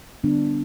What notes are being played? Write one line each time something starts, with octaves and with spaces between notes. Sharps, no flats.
D3 G3 B3 D4